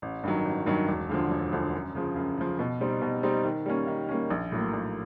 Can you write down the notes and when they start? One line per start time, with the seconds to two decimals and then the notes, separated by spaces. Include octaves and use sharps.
0.02 A1
0.23 G2 D#3 F#3
0.45 A1
0.66 G2 D#3 F#3
0.88 E1
1.09 D2 D3 F3
1.31 E1
1.52 D2 D3 F3
1.73 F#2
1.95 C#3 F3
2.16 F#2
2.38 C#3 F3
2.59 B2
2.81 G3 C4 D#4
3.02 B2
3.23 G3 C4 D#4
3.44 D#3
3.66 G3 A#3 C#4
3.87 D#3
4.09 G3 A#3 C#4
4.30 A#1
4.52 A2 F#3 A#3
4.73 A#1